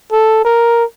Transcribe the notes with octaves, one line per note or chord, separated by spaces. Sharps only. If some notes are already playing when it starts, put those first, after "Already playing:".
A4
A#4